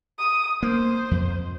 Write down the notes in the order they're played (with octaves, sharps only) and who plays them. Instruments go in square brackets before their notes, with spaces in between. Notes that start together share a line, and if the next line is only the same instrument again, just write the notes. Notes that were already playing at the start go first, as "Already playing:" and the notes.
[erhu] D#6
[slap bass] A#3 [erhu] C5
[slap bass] F2